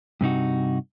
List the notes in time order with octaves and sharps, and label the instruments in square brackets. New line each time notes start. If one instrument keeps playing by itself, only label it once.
[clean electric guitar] G2 C3 D#4 F#4